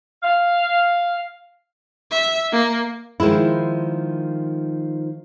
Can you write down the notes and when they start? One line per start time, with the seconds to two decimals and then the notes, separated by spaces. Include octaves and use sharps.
0.23 F5
2.11 E5
2.52 A#3
3.20 D#3 F3 G#3 E4